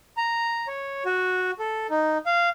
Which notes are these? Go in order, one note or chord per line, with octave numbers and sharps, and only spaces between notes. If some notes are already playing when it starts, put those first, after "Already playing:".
A#5
C#5
F#4
A4
D#4
F5